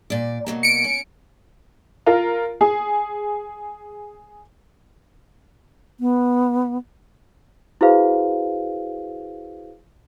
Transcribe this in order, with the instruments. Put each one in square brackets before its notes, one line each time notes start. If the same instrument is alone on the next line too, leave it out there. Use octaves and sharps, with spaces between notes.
[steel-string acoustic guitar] A#2 D5
B2 F#3 A#3
[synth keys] C#7 D7
[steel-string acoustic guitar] C#4
[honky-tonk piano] F4 A#4
G#4
[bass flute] B3
[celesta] E4 F#4 G#4 B4 C5 F5